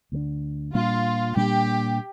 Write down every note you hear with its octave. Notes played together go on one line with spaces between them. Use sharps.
D2 D3 A3 D4
A#2 G3 A#3 D4 F4
A#2 G3 A#3 D4 G4